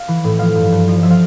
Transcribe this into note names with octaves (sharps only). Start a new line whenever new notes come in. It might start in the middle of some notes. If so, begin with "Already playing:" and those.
Already playing: F5
E3
A2
F3 F5
G2
G2
F3
F3 E5
F5